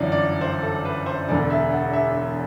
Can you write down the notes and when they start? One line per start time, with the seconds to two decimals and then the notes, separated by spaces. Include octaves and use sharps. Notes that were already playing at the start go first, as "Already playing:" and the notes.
Already playing: G1 F#2 E3 D5
0.12 D5
0.41 C5
0.63 A4
0.85 B4
1.06 C5
1.28 E1 E2 D3 D5
1.50 E5
1.72 F#5
1.93 E5